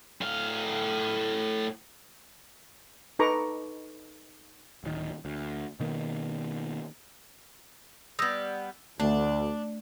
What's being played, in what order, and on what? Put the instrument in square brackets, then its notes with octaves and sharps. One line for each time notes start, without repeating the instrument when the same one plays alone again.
[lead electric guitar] A2 F5
[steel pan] D#4 A4 B4 A#5 C#6 D6
[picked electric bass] D1 D#3
D2
B2 D#3 A#3
[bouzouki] G3 B3 [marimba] D#6 E6 A#6
[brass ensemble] D2 [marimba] A3 [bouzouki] D4